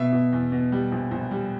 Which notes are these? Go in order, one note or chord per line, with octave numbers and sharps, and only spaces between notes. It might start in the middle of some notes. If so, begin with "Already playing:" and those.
Already playing: B2 E5
B2
E2
B2
G3
A#1
A#1
G3